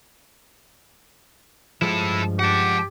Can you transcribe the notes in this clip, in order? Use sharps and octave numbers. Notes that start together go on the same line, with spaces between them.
G2 F3 G#3 E4 A4
G4 F#5 A5